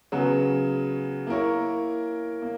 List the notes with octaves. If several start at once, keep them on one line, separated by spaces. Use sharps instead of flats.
C#3 F#3 B3
A#3 E4 A#4 C#5
A#3